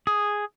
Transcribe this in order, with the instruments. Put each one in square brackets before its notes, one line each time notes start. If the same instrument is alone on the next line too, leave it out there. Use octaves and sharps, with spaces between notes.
[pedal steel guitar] G#4